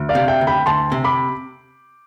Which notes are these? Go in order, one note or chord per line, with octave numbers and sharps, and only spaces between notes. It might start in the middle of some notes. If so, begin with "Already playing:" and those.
Already playing: D2
D5 F5
C3
E5 G5
D2
G5 B5
D2 A5 C6
C3
B5 D6